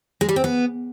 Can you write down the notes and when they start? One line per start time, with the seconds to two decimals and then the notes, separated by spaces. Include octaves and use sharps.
0.21 G#3
0.29 G3
0.36 C4
0.44 B3